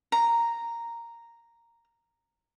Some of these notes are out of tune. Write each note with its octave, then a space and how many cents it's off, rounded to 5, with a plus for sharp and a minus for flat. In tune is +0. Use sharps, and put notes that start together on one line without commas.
A#5 -5